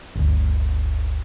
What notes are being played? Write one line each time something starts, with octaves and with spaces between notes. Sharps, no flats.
G1 D2